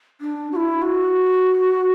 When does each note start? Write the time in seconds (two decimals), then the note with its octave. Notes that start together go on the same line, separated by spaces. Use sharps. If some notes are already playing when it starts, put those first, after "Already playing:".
0.21 D4
0.52 F#4
0.56 E4
0.82 F#4